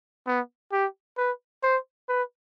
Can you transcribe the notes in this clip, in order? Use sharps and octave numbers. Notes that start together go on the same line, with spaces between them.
B3
G4
B4
C5
B4